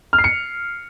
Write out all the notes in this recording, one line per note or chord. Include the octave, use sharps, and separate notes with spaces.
F6
C7
C#7